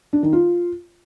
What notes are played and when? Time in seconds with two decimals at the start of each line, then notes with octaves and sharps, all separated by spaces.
0.13 D4
0.23 D#3
0.33 F4